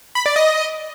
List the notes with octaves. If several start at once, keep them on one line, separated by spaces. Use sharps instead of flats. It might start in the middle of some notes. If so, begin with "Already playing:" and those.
B5
D5
D#5